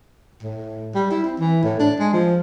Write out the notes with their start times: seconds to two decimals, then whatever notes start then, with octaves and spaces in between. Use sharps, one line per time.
0.43 A2
0.95 G3
1.11 E4
1.24 C4
1.39 E3
1.64 A2
1.80 D4
2.00 G#3
2.13 F3